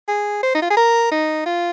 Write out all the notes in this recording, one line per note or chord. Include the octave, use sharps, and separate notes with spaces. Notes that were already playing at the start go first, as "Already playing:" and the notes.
G#4
C5
D#4
F4
G#4
A#4
D#4
F4